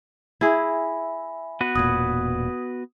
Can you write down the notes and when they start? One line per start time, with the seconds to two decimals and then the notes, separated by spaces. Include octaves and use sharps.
0.41 E4 G#4 E5 G#5 B5
1.61 B3 F#4 B4
1.76 E1 A#2 D#6 G#6